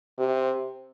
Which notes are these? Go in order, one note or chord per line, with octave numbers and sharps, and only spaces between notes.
C3